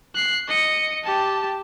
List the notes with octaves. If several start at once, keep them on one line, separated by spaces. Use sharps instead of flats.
F#6 C7
D#5 C#7
G4 A5